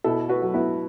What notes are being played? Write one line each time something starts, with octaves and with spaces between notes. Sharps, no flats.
B2 E4 A4
F#4 B4
F#3
B3 E4